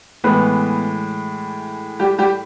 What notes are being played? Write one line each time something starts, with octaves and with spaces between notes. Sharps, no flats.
A2 E3 G#3 B3 B4
G3 G4
G3 G4